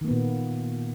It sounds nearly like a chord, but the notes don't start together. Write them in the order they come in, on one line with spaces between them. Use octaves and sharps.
D#3 A#3 B3 A#2